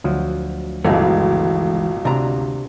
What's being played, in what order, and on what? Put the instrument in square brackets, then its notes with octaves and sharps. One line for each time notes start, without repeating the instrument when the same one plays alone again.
[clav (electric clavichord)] D2 F3 F#3
[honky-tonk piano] G1 C#2 B2 [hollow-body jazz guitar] E3 G#3 A3
[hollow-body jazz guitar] D2 A#5 [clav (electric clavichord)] C3 D4